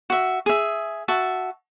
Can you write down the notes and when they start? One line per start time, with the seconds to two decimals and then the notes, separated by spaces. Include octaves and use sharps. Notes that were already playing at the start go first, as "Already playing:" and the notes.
0.10 F#4 E5
0.46 G#4 E5
1.08 F#4 E5 A5